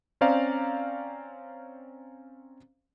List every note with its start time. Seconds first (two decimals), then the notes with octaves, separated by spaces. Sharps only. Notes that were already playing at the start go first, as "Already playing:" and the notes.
0.21 C4 C#4 C5 D5 F5 A#5